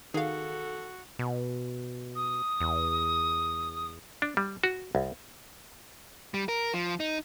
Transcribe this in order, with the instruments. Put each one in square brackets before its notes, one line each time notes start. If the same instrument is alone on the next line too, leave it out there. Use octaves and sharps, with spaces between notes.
[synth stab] D#3 [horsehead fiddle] F#4 [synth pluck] G#4 F5 [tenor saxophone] A4
[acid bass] B2
[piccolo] D#6
[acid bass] E2
[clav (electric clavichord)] D4
G3
F#4
C2
[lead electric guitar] G3
A#4
F3
D#4